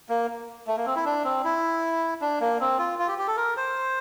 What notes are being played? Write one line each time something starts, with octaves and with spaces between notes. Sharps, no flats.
A#3
A3
A#3
C4
E4
D4
C4
E4
D4
A#3
C4
F4
F4
G4
G4
A4
A#4
C5